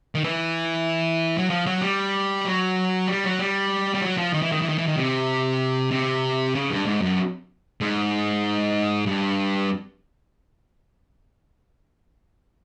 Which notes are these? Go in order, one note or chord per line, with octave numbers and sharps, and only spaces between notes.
D#3
E3
F#3
F3
F#3
G3
F#3
G3
F#3
G3
G3
F#3
F3
D#3
E3
D#3
E3
D#3
E3
D#3
C3
C3
C#3
G2
G#2
F#2
G#2
G2